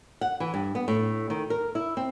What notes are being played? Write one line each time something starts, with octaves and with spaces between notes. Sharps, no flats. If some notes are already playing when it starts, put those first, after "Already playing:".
F#5
E3
G2
B3
A2
D#3
A#4
E4
C4